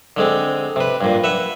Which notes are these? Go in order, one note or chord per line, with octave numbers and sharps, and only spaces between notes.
D3 G#3 C4
C3 B4
G2 A#2
B4 E5 F#5